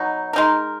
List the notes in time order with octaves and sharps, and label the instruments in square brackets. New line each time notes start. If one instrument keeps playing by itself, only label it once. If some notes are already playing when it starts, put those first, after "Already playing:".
Already playing: [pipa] B2 F#3 D#4
G#3 D#4 A#4